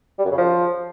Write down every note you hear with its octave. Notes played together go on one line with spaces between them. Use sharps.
G3
F#2
C#3
F3